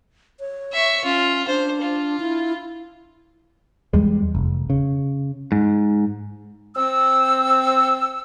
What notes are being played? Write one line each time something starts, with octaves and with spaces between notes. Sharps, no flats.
C#5
E5 C#6
C#4 F4
D4 C5
F4
E4
E2 G3 G#3
F1
C#3
G#2
C4 E6